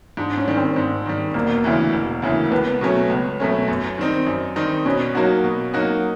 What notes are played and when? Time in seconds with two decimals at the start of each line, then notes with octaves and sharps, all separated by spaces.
0.17 G#2 D4
0.37 C#4
0.48 D#3 G3 C#4
0.57 C4
0.76 G#2
1.06 D#3 G3
1.34 E1 A#3
1.64 D2 C#3 E3
1.93 E1
2.22 D2 C#3 E3
2.51 C#2 B3
2.81 B2 F#3 A3 C#4
3.10 C#2
3.40 B2 F#3 A3 C#4
3.68 F#2
3.98 D#3 G3 C4 D#4
4.27 F#2
4.56 D#3 G3 C4 D#4
4.85 B2 C#4
5.15 F#3 A#3 D#4 F#4
5.44 B2
5.74 F#3 A#3 D#4 F#4